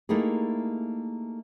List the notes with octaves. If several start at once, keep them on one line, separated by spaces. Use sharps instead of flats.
A3 A#3 D#4 E4 G4 G#4